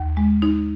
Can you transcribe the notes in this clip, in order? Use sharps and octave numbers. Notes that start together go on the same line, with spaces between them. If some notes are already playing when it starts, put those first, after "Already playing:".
Already playing: D#2
G#3
D#4